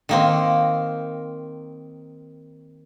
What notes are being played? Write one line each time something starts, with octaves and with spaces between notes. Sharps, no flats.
D#3 A#3 C4